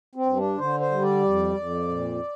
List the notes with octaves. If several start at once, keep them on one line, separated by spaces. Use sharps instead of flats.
C4
G2
D4
D3 C5
C5
G3
D5
F2
F2
A#2